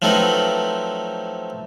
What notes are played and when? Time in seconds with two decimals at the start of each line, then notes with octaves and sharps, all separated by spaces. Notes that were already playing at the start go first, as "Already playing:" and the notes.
0.02 F3 F#3 A3 C4 D#4 B4